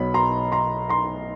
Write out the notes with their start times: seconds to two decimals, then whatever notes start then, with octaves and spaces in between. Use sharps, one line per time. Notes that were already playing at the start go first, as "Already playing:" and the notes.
Already playing: B1 B2 F#3 B3 B5
0.14 A#5 C6
0.52 A#5 C6
0.89 A#5 C6